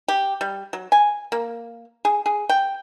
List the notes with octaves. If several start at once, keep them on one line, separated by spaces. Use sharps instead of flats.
G4
G3
F#3
G#5
A#3
G#4
G#4
G5